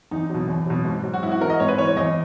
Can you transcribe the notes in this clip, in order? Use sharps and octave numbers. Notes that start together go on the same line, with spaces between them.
E2 D#4
B2 F#3
E2
B2 F#3
G#2
F#3
F#4
G#2 E4
F#4
E3 A#4
D#5
G#2 C#5
B4
E3 C#5
C#5
E2 D#5